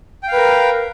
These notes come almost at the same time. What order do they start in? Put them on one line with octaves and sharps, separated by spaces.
G5 F5 B4 A#4